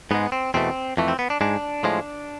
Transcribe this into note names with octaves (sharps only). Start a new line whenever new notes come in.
G#2 G#3 B3
C4
E2 B2 A3 C4
F2 E3 A3
C4
B3
D4
G#2 G#3 D4
A2 F3 G#3